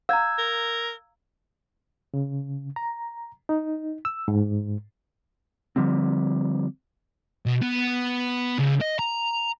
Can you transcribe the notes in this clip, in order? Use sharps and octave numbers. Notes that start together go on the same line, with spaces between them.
F5 A#5 E6 G6 G#6
A#4
C#3
A#5
D#4
E6
G#2
D3 F3 G3 C4
B2
B3
C#2
D#5
A#5